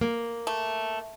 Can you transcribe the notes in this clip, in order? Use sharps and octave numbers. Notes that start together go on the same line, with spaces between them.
A#3
A3